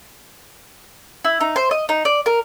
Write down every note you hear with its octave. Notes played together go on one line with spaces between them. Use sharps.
E4
D#4
C5
D#5
D#4
D5
A#4